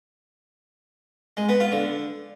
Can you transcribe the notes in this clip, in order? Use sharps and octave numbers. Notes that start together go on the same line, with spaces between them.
G#3
B3
F4
D3